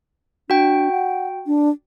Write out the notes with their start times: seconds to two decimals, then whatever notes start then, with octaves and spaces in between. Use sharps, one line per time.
0.50 D4 F#4 G5
0.91 F#5
1.47 D4